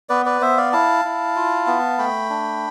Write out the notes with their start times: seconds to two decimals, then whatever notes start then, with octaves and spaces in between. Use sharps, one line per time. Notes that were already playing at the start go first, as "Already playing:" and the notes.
0.09 B3 B4 D5
0.26 B4 D5
0.41 B3 C5 E5
0.57 D5 F5
0.73 E4 F5 A5
1.05 E4
1.36 F4
1.67 B3
1.98 A3 G5 B5
2.30 D4